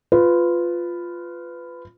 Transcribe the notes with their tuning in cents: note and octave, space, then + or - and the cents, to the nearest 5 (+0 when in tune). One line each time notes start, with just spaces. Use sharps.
F4 +0 B4 +15